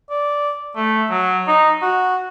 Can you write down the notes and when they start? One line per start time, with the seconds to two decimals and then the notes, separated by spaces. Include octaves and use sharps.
0.10 D5
0.76 A3
1.10 F#3
1.47 D#4
1.82 F#4